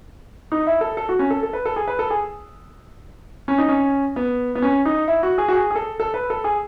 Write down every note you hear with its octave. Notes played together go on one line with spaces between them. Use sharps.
D#4
E4
A4
A4
F#4
C#4
A4
A4
B4
A4
G#4
B4
A4
G#4
C#4
D#4
C#4
B3
B3
C#4
D#4
E4
F#4
G#4
F#4
G#4
G#4
A4
A4
B4
A4
G#4